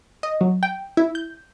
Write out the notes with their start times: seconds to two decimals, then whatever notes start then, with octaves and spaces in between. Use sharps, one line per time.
0.23 D#5
0.41 F#3
0.63 G5
0.97 E4
1.15 G6